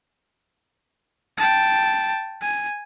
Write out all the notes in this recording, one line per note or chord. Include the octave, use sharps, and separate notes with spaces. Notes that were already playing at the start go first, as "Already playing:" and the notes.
G5 A5
G#5